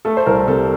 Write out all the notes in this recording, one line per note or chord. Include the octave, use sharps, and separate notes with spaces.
A3 A4
C5
C2 A#4
C3 A4